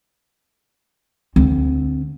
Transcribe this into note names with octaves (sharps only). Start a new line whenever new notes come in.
D2 C4